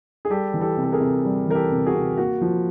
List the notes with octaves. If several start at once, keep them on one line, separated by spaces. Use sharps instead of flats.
G#4
G3 G4 A4
E3
G4 A4
C3
A4
G#4 A#4
C3
G3
E3 A#4
G4 A4
C3
F#4 G#4
C3
A#3 F#4
F3